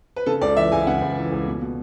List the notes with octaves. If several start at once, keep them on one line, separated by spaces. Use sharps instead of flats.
B4
C#3 A4
C#2 D5
E3 E5
C#2 G#5
C#3 F#5
C#2
E3
C#2
B2
B2